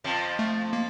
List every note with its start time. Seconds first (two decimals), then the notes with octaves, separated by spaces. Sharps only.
0.04 F2 F3
0.39 A3
0.73 A#3